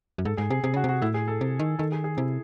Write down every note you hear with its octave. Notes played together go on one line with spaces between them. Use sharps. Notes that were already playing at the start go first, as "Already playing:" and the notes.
F#2
G#2 A4
G#2 G#4
C3 G#4
C3 G#4
C#3 F#4
C3 F#4
A2 E4
G#4
A4
C3
D#3
D#3 A4
G#4
G#4
C3 E4